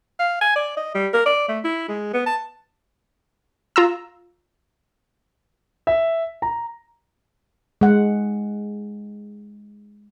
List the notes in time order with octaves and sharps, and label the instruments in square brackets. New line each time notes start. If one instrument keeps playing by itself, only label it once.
[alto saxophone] F5
G#5
D5
D#5
G3
A#4
D5
A3
E4
G#3
B3
A5
[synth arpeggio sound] F4 A#5 E6
[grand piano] E5
A#5
[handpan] G#3 F#5